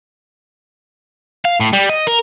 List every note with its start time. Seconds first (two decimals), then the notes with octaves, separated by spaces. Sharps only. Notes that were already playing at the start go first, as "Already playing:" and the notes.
1.45 F5
1.60 A2
1.73 G3
1.90 D#5
2.07 A#4